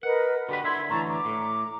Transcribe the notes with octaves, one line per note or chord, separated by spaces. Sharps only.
A#4 B4 D#5 F#5
D3 F#4 G4 B4 B5 C6
D3 E4 E5 B5 C6 G#6
A2 D3 E3 A5 A#5 C#6
A#5 D6
A2